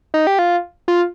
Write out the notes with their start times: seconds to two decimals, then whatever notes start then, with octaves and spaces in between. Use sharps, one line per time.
0.14 D#4
0.27 G4
0.39 F4
0.88 F4